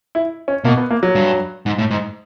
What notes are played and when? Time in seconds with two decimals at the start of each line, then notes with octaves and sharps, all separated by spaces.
0.15 E4
0.48 C#4
0.64 B2 A#3
0.77 B3
0.91 A#3
1.03 F#3
1.15 G2
1.66 G#2
1.78 A2
1.91 G#2